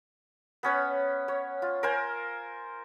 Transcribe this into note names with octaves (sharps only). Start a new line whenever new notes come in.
B3 C#4 B4 C#5
C#5
F4
A#4 C5 G#5